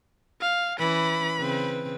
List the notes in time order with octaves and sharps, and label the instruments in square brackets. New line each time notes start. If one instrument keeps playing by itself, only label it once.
[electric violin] F5
[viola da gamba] E3 C#4 [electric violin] B5
[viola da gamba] C#3 C4 B4